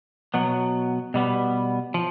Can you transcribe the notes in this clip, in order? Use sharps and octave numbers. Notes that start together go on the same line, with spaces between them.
B2 F#3 B3
B2 G3 B3
F3